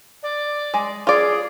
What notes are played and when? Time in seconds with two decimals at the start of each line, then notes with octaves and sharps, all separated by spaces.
0.22 D5
0.74 G#3
1.07 F4 G#4 D5